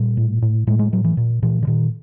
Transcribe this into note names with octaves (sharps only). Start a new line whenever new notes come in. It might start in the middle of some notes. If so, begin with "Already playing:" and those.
Already playing: A#2 G3
A2
A2
A2 G#3
G#3
A2 F#3
E3
A#2
A#2 E3
D3
A#2 D#3